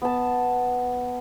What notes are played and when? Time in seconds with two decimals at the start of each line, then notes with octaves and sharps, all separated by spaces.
0.02 B3 A5